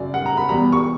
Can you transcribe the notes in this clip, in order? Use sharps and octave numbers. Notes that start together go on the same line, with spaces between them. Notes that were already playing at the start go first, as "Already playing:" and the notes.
Already playing: F#2 C#3 F#3 D5
F#5
A#5
B5
E2 B2 G3 A#5
C#6